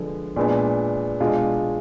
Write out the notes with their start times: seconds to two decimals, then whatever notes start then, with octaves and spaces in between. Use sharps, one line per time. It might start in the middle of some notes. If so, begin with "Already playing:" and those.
Already playing: D3 F3 G#3 B3
0.36 A#2 G#3 B3 D4
1.20 B2 G#3 D4 F4